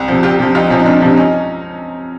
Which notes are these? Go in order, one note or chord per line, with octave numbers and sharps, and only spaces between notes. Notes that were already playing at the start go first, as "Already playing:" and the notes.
Already playing: C2
C3 F3
C2 F4 G4
C3 F3
C2 D#4 F4
C3 F3 C#4
D#4
C2 D4
C3 F3 D4
C#4 D#4